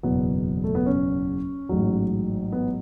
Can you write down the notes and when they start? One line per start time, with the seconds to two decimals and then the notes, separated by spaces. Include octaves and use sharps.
0.03 F#1 E2 B2 F#3 B3
0.64 A3
0.75 B3
0.86 C#4
1.69 A1 G#2 F#3
2.52 B3